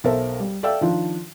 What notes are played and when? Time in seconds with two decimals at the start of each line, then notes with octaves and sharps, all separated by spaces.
0.04 B1 A4 A#4 C5 E5
0.40 G3
0.63 A4 D5 E5 F5 G5 E6
0.81 D#3 F3 D4